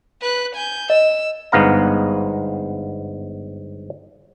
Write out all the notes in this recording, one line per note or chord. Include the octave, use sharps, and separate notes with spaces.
B4 F#6
G#5 G6
D#5 E6
G1 G#2 B3 F5 A#5